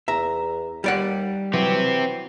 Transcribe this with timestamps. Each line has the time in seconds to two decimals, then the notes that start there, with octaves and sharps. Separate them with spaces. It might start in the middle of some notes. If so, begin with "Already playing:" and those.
0.08 E2 E5 A#5
0.84 D#2 G3 D5 F#5
1.53 E3 F#3 C4 G4